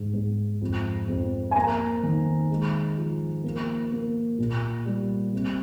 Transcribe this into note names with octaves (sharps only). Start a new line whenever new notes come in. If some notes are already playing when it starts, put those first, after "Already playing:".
Already playing: G#2
G#2
F2
F2
G#5
A#3 A#5
D#3
G#3
F3
A#3
A#3
A#2
G3
C3